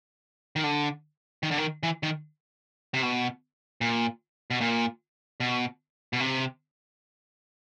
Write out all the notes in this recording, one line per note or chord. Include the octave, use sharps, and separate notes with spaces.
D#3
D3
D#3
D3
D#3
E3
D#3
C3
B2
A#2
B2
A#2
B2
B2
C3